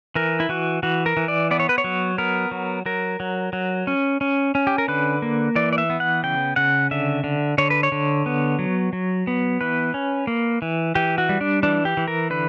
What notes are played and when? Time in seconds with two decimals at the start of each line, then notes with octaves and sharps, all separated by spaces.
0.15 E3 A#4
0.40 E4
0.49 E3 F#4
0.83 E3 F#4
1.06 A#4
1.17 E3
1.28 D5
1.51 B3 D5
1.60 C#5
1.69 B4
1.78 C#5
1.84 F#3
2.18 B3 A#4
2.51 F#3
2.86 F#3 A#4
3.20 F#3
3.53 F#3
3.87 C#4
4.21 C#4
4.55 C#4
4.67 G4
4.78 A#4
4.88 D3 B4
5.22 A#3
5.56 E3 D5
5.73 D5
5.78 E5
5.90 B3
6.00 F#5
6.23 C#3 G5
6.56 C#3 F#5
6.91 D3 E5
7.24 D3
7.58 D3 C#5
7.70 B4
7.83 C#5
7.92 D3
8.26 B3
8.59 F#3
8.93 F#3
9.27 B3
9.61 E3 B4
9.94 C#4
10.27 A#3
10.62 E3
10.95 E3 G4
11.18 F#4
11.29 G3
11.41 D4
11.63 E3 D4
11.85 G4
11.97 E3
12.08 A#4
12.30 D3 B4